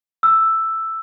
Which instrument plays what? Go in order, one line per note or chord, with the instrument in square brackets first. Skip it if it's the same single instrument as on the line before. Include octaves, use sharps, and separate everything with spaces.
[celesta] E6